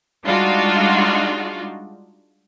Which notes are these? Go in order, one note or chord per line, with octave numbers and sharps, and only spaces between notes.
G3 G#3 D4 D#4 F4 F#4